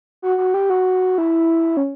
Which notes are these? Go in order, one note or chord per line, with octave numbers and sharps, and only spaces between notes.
F#4
F#4
G4
F#4
E4
C#4